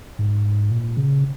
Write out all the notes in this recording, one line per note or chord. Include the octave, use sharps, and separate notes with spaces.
G#2
A#2
C#3